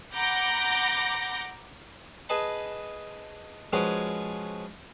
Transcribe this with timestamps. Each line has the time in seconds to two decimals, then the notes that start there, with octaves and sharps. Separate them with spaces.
0.13 F#5 A#5 B5 D6 G6 A#6
2.29 G#4 B4 D#5 A5 B5
3.73 F3 G#3 C#4 F#4 G#4 B4